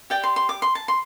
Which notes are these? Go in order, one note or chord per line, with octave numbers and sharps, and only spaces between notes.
G4 D5 G5
C6
C6
D6
C6
A5
C6